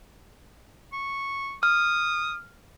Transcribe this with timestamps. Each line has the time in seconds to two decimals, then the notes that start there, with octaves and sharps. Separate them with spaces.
0.93 C#6
1.63 D#6 F6